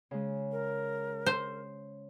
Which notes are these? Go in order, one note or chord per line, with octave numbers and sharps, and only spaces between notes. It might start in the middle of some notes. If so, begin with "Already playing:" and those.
C#3 G#3
A#4
C5